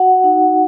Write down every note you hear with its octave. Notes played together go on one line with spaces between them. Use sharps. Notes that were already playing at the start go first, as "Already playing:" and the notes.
Already playing: F#4 F#5
D#4